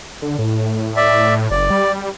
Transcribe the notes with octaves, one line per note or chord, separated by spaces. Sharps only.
D3
A2
D5 E5
F#1 D5
G3